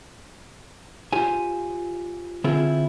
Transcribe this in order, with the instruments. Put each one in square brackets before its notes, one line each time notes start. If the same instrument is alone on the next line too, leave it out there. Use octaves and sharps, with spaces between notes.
[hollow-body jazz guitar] F4 G4 C5 G#5
D3 C4 E4 F4 G#4